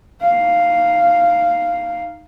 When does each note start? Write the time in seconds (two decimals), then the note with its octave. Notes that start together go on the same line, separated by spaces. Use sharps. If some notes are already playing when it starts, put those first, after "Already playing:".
0.21 D#4 F5